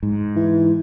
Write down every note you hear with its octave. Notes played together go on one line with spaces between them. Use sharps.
G#2
E3